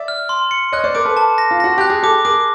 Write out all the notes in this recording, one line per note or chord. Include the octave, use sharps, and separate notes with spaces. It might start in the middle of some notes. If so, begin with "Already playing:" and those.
Already playing: D5 E5
F6
C6
C#7
C#5 D#5 F#6
C5 D5
A#4 C5 D6
A4 B4
A5
A#6
F4
F#4 A#6
G4 F#6
G#4
G4 A4 D6
G#4 A#4 D6